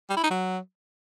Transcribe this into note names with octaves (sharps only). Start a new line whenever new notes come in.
G3
E4
D#4
F#3